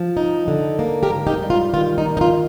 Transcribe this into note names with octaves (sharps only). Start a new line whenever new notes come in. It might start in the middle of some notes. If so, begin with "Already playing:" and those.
Already playing: F3
D#4
D3
A#3
G4 A#4
G#2
D#4 G4
G3
F4
D#3 F4
D#4
A#3
D#4
F4